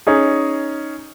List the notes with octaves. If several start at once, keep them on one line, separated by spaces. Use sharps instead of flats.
C#4 D#4 G#4